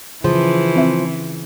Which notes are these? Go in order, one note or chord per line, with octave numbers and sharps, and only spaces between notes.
C#3 E3 F3
C4 E5